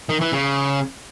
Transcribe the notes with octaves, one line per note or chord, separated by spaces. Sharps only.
D#3
E3
C#3